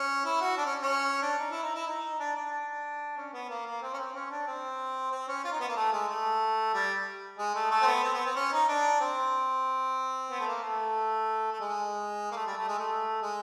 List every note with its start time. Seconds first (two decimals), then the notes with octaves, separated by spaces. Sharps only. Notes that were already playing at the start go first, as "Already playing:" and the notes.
Already playing: C#4
0.25 E4
0.41 F#4
0.57 D4
0.65 C#4
0.82 C#4
1.22 D4
1.39 D#4
1.50 E4
1.63 D#4
1.74 E4
1.87 D#4
2.19 D4
2.36 D4
3.17 C#4
3.33 B3
3.49 A#3
3.65 A#3
3.82 C4
3.93 C#4
3.98 C4
4.14 C#4
4.30 D4
4.47 C4
5.11 C4
5.28 C#4
5.44 F4
5.52 D#4
5.60 B3
5.68 A#3
5.76 A3
5.92 G#3
6.09 A3
6.74 G3
7.38 G#3
7.55 A3
7.71 A3
7.82 C4
7.87 B3
8.03 C4
8.14 B3
8.25 C4
8.36 C#4
8.52 D#4
8.68 D4
9.00 C4
10.30 B3
10.40 A3
10.47 A#3
10.63 A3
11.52 A3
11.60 G#3
12.31 A#3
12.36 A3
12.46 G3
12.57 A3
12.68 G#3
12.79 A3
13.22 G#3